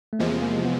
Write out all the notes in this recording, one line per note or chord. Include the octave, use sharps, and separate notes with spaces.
A3
E2 C3 F3 G#3 A#3
A#3
B3